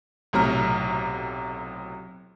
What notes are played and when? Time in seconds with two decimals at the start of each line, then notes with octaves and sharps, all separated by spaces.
0.33 B1 A2 C3 F#3 A#5 F6